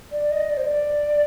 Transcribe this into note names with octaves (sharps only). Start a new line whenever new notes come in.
D5
D#5
D5
C5
D5